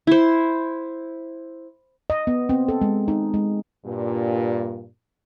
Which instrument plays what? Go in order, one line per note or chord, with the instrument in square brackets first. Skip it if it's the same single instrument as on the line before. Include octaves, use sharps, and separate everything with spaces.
[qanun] E4 C5
[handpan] D#5
B3
C4
A4
G#3
D#4
G#3
[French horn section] G2 A#2